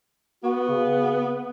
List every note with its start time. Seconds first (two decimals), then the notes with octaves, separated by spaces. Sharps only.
0.44 B3 F#4
0.69 C#3